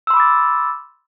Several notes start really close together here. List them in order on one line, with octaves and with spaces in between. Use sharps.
E6 C6 B5 D6 A6